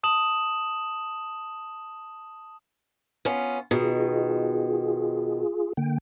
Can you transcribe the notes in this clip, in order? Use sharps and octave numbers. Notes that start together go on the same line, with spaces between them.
A5 D#6 E7 F#7
B3 C#4 F4
B2 D#3 F4 G#4
D3 A#3 G5